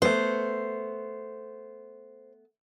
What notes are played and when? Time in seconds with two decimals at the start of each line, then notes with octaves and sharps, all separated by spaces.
0.02 A3 B3 C5